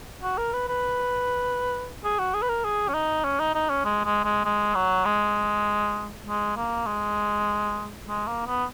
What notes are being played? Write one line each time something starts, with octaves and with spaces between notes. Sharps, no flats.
F#4
A#4
B4
B4
G#4
F#4
G#4
B4
A#4
G#4
C#4
D#4
C#4
D#4
D#4
C#4
G#3
G#3
G#3
G#3
F#3
G#3
G#3
A#3
G#3
G#3
A#3
B3